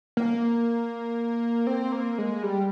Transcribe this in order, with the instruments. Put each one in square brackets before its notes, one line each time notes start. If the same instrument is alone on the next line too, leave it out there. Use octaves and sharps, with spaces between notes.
[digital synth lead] A#3
C4
A#3
G#3
G3